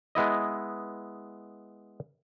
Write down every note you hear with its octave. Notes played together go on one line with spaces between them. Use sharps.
G#3 B3 E4 D#5